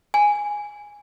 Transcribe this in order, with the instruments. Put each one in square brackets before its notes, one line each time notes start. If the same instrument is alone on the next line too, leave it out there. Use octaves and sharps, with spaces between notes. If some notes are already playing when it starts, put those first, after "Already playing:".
[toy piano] G#5